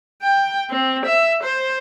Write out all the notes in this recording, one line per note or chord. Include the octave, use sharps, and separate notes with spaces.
G5
C4
E5
C5